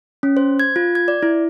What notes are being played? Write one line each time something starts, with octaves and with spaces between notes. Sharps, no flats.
C#4
C5
G#6
F4
G#6
D5
E4